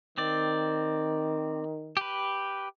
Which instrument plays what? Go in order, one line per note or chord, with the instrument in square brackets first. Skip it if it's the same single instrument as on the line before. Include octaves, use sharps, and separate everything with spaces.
[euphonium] D#3 [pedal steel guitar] C4 D5
[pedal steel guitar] G4 B4